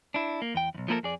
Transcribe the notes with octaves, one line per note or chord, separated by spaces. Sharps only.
D4 E4
A#3
E2 G5
B1 E2
F3 A3 A#3 E4 A4 A#4
F2 G#4 D5